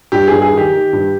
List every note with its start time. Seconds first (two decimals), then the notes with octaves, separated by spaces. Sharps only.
0.12 G2 G4
0.28 G2 G#4
0.42 G#4
0.53 D#3 G4
0.72 D#3
0.93 G2